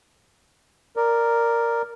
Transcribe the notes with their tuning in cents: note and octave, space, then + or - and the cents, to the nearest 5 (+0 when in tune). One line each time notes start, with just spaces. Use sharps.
A#4 +0 D5 +0